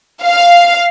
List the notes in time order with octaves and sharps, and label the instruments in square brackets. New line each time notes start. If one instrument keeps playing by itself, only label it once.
[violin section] F5